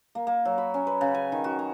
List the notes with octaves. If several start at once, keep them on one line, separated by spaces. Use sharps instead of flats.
A#3
A#3
F#3
B5
C#4
B4
C#3
G#5
D#3
F#4
A#5